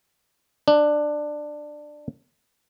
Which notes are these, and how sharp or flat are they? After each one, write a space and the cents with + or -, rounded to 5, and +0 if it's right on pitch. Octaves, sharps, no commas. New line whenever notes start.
D4 +15